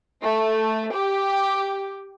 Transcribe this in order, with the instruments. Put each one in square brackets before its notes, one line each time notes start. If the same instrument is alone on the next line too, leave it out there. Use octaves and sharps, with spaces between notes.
[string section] A3
G4